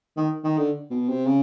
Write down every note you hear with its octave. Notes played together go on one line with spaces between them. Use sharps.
D#3
D#3
D3
B2
C3
C#3